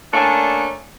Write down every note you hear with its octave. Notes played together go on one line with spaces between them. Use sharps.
A3 A#3 C#4 D4